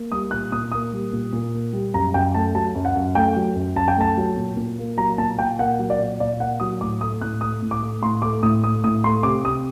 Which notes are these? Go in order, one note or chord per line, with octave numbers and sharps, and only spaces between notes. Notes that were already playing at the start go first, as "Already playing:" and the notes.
Already playing: A#3
G3 D#6
A#2 F#6
A#2 D#6
A#3 D#6
G3
A#2
A#2
A#3
G3
F#2 A#5
F#2 G5
A3 A5
F#3 A5
F#2
F#5
F#2
A3 G5
F#3
F#2
F#2 A5
G5
A3 A5
F#3
A#2
A#2
A#3
F#3 A#5
A#2 A5
A#2 G5
A#3 F#5
F#3
D5
A#2
A#2 D5
A#3 F#5
F#3 D#6
A2 D6
A3 D#6
A2 F#6
A3 D#6
A2
D6
A3
A2 C6
A3 D6
A2 D#6
A3 D#6
A2 D#6
A3 C6
C3 D6
C3 D#6